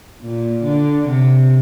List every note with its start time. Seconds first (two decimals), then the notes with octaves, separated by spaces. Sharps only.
0.22 A#2
0.64 D3
1.08 C3